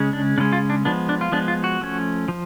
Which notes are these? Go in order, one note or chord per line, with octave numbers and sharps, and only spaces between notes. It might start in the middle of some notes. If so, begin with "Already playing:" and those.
Already playing: C#3 G#3 C#4
D4
C#3 G#3 C#4 D4
F4
D4
F3 G#3 B3 D4
D4
F4
F3 G#3 B3 D4
F4
F#4
F3 A3 C#4
F3